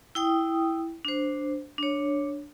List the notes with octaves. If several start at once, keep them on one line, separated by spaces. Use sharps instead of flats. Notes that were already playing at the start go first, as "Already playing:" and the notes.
E4 G5 D#6
D4 C5
D4 C#5